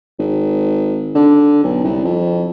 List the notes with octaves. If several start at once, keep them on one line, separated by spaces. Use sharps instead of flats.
G#1
D3
B1
C2
F2